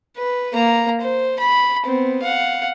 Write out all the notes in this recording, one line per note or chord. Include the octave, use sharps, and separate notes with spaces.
B4
A#3 A#5
C5
B5
B3 C4
F5 F#5